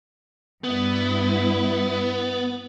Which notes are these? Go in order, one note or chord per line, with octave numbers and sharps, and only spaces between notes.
G2 B3 E4